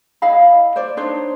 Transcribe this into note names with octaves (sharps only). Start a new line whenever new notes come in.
E4 D#5 F5 B5
C5 D5
D4 D#4 C5 C#5